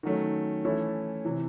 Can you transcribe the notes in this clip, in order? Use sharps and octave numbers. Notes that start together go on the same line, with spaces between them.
D#3 F#3 A3 C#4
E3 A3 C#4 E4 A4
C3 E3